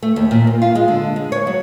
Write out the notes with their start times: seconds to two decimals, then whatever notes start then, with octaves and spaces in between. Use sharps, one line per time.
0.03 A3
0.16 D#2
0.31 A#2
0.47 A#3
0.62 F4
0.75 G#3
0.88 D3
1.16 G#3
1.32 C#5
1.47 F#3